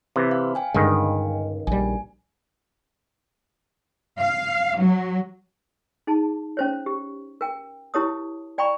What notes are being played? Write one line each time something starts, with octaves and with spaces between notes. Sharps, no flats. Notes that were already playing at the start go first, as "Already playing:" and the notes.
C3 E3 B4 C5
F5
F5 G5 G#5
C#2 G2 D3 D#3 G#3
A#1 G3 G#5
F5
F#3
D#4 G#4 A5
C#4 C5 C#5
G4
A#4 G5
E4 G4 A#4 C#5 A5 D#6
D5 G5 A#5 B5 C#6